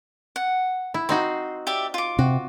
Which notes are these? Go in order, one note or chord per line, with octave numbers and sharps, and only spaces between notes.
F#5
E4
C4 D#4 F#4 C6
G4 D5 E5
F4 D6
C3 F#4